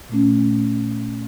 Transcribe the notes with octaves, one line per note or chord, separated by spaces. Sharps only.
A#2 A3 C#4